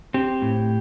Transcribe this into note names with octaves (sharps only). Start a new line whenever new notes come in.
C4 G4
A2